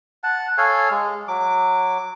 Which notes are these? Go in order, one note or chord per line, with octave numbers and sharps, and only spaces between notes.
F#5 A5
A4 C#5 F5 G#5
G#3
F#3 D6